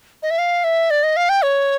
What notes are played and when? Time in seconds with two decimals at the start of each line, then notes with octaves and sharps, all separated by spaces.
0.23 D#5
0.31 E5
0.38 F5
0.64 E5
0.90 D5
1.03 D#5
1.17 F5
1.29 G5
1.42 C#5